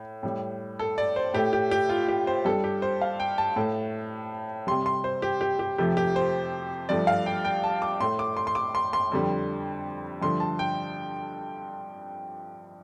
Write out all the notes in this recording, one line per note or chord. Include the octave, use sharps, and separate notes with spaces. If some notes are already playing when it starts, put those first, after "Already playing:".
Already playing: A2
A2 G3
A4
D5
C5
A2 A3 G4
G4
G4
F4
G4
C5
G2 G3 A4
G4
C5
F5
G5
A5
A2 A3
C3 G3 C6
C6
C5
G4
G4
G4
F2 C3 F3 A3 G4
G4
C5
G2 F3 A3 D5
F5
G5
G5
A5
D6
A2 A3 C6
D6
C6
C6
D6
C6
C6
F2 D3 G3
G2 D3 F3 A3 C6
A5
G5